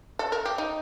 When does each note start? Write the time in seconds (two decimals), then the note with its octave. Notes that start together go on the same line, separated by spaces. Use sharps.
0.19 A4
0.32 A#4
0.45 G4
0.58 D#4